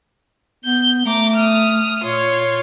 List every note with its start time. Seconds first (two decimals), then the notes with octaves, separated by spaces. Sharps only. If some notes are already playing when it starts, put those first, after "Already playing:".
0.65 B3 G6
1.05 A3 A#5 D6
1.36 D#6 F6
2.03 A#2 F4 C#5